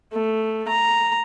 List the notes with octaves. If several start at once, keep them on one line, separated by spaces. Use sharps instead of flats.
A3
A#5